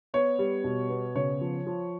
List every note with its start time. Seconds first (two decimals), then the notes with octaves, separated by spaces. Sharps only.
0.14 B3 C#5
0.39 G3
0.64 B2
0.90 B3
1.15 C#3 C#5
1.41 F3
1.67 F3